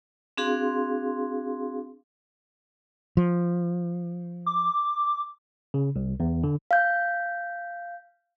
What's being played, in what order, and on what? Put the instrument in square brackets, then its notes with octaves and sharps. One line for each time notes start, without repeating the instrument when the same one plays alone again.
[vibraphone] C4 D4 F#4 G#4 F5 C6
[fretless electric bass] F3
[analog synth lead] D6
[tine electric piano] C#3
C2
E2
D3
[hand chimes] F5 G6